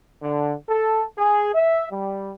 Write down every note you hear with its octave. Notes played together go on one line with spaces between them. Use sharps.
D3
A4
G#4
E5
G3